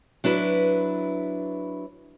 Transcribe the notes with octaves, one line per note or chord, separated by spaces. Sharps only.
F#3 D4 E4 B4